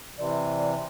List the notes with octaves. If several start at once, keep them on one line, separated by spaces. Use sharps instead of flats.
C3 E3 D5